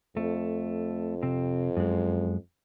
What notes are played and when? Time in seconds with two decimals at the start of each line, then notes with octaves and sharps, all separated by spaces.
0.17 F2 A3
1.23 C3 C4
1.77 F#2 G#3